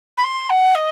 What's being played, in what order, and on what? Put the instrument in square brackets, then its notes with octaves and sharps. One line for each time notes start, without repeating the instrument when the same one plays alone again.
[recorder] B5
C6
F#5
D#5